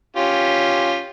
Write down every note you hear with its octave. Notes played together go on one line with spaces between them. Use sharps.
C#4 F4 G4